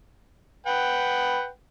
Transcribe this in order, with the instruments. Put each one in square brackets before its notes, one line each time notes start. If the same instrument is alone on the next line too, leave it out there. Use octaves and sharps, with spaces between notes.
[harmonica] B4 F#5 G5